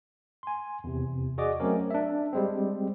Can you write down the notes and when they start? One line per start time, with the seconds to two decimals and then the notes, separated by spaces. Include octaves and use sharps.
0.43 G#5 C6
0.84 E2 C3
1.38 F#4 G#4 D5 D#5 D6
1.60 F#3 A3 C4 C#4 A#4
1.91 D4 E5
2.33 G3 G#3 C4